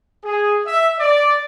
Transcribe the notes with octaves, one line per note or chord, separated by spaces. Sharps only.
G#4
E5
D5